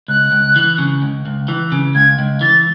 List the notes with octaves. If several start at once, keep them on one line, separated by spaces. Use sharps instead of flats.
C#2 F#6
C#2
E3
C#3
C#2
C#2
E3
C#3
C#2 G#6
C#2
E3 A6